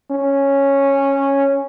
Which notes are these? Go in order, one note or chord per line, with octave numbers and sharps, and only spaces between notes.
C#4